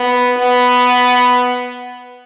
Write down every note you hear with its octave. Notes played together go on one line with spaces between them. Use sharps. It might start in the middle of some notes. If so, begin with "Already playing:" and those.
Already playing: B3
B3